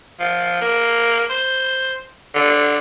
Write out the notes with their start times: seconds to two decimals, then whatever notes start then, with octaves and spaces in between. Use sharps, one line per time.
0.20 F3
0.61 A#3
1.30 C5
2.35 D3